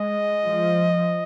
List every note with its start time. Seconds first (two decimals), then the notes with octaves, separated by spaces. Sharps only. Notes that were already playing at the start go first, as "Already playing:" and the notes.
Already playing: G#3 D#5
0.46 F3